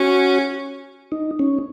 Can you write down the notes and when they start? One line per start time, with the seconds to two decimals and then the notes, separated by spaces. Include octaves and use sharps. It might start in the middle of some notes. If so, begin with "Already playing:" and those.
Already playing: C#4 F#4
1.12 D#4
1.39 C#4